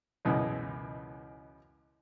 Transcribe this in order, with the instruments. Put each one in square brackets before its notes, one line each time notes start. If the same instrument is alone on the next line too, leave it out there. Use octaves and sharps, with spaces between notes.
[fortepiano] C#2 F#2 B2 E3 G#3